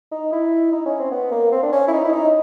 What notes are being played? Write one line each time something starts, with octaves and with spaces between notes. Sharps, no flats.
D#4
E4
D#4
C#4
C4
B3
A#3
C4
D4
C#4
E4
D#4
E4
D#4